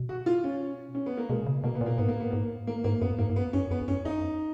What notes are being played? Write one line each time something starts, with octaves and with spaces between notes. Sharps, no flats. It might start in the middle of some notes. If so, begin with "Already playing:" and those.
Already playing: B2
F#4
F4
C#4
C#4
B3
A#3
B2 G#3
C#3
B2 A#3
B3
A#2 A#3
G#2 B3
A#3
B3
G#2 A#3
A#3
G#2 A#3
F#2 B3
G#2 A#3
G#2
F#2 B3
F#2 C#4
F2 B3
F2
F#2 C#4
F2 D#4